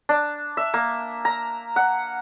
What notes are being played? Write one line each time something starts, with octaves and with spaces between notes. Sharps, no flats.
D4
E5
A#3
A#5
F#5